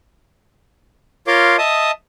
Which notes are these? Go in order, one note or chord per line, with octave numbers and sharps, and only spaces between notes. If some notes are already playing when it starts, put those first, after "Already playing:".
F4 A#4 C#5 F5 C6 D6
D#5 E5 A5 D#6